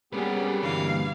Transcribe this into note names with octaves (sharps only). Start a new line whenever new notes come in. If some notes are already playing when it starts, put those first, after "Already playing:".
G3 A#3 B3 C#4 G4 G#4 B4
G2 B2 D3 E3 F5